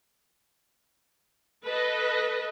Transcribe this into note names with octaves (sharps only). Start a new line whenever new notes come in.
A4 B4 D#5